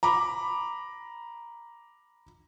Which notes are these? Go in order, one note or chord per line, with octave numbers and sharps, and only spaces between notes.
A#5 B5 D6